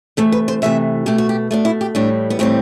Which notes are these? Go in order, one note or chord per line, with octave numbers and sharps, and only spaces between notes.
C3 E3 A3 A4
B4
C5
C3 E3 A3 E5
B2 A3 G4
F#4
G4
B2 A3 D4
E4
G4
A2 E3 G3 D4
B3
A2 E3 G3 C4